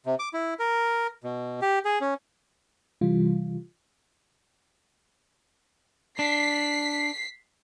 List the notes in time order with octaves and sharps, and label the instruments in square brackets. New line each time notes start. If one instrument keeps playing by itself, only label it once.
[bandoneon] C3
D6
E4
A#4
B2
G4
G#4
C#4
[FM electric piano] C3 E3 G3 F4
[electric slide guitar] D4 [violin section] B6 C7